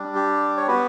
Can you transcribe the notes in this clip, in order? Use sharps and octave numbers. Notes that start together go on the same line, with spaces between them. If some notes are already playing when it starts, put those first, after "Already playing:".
Already playing: G3 D4
G4
C#5
B3 F#4 G4 B4